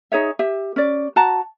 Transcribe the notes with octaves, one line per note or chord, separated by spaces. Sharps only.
D#4 G#4 C#5 E5
G4 E5
C#4 D5
F#4 F#5 A5 A#5